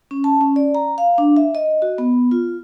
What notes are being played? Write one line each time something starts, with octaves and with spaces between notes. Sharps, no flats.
C#4
A5
C#4
D5
A#5
F5
D4
E5
D#5
F#4
B3
F4